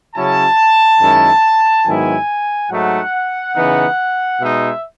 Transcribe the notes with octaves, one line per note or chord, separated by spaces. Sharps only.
C#3 F#3 C#4 E4 A5
F#2 D#3 G#3 C#4 E4
G#2 D#3 F#3 B3 E4 G#5
G#2 F#3 A3 D#4 F#5
C#3 E3 B3 D#4
B2 G#3 D#4 E5